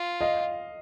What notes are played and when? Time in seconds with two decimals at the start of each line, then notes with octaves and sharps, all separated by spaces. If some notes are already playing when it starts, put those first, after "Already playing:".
Already playing: F4
0.21 D#5 F5